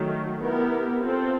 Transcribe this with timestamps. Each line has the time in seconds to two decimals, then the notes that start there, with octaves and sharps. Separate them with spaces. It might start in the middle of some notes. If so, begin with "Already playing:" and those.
Already playing: D#3 F#3 A3
0.40 B3 E4 G4 A#4
1.02 C4 F4 A4